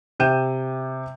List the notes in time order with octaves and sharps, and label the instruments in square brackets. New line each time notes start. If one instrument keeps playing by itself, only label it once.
[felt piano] C3 G5 G6 D#7 E7